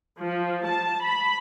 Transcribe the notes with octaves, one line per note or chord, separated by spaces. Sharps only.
F3
A5
B5